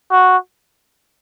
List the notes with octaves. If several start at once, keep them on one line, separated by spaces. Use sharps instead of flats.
F#4